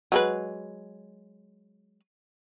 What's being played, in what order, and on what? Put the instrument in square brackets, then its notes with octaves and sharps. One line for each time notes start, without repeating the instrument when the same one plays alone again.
[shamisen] F#3 G#3 B4